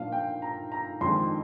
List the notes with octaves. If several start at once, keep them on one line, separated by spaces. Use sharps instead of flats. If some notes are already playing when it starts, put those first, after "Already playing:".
Already playing: A#2 F3 A#3 D4 F5
G5
A#5
A#5
F2 D#3 G#3 D4 C6